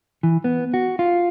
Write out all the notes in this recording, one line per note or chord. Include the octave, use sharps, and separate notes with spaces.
E3
B3
F#4
F4